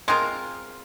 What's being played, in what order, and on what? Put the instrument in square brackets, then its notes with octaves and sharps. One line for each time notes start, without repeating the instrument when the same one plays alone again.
[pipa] G#3 C4 F4 A#4 [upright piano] C6